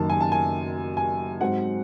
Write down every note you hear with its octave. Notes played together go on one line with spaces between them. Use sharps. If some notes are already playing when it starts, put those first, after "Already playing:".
Already playing: F#1 F#2 D#3 A5
G#5
A5
G#5
G#5
G#2 F#3 C4 F#5